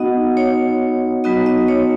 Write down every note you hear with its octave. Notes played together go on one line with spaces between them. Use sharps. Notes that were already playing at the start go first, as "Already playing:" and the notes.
Already playing: B3 D#4 F#4 D#5 F#5
C#5
F#3 B3 D#4 F#4 D#5
D#5
C#5